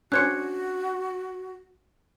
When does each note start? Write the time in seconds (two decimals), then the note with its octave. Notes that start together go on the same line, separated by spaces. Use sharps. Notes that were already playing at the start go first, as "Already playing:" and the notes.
0.12 C#4 D4 F#4 C5 F#6 G#6 C#7